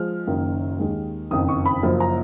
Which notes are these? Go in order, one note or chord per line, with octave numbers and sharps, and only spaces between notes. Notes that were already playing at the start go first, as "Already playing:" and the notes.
Already playing: F3 G#3 F6
F#1 F#2 D#3 A#3
D#2 D#3 G#3
F#1 F2 D#3 D#6
C#6
B5
F#1 F#2 F3 A#3
A#5